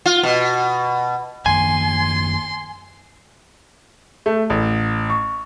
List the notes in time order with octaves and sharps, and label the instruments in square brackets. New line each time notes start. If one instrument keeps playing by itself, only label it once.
[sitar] F4
B2
[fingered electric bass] F#2 D#3 A#3 [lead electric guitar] G#5 [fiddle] C6
[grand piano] A3
A1
C#6